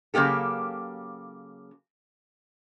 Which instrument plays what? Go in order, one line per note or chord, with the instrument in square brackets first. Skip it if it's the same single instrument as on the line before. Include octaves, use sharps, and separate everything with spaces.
[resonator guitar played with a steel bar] C#3 F#3 A#3 G4 A4